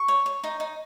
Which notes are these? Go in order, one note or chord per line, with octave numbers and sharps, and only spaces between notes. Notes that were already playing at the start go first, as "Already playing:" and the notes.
Already playing: C#6
C#5
C#5
D#4
D#4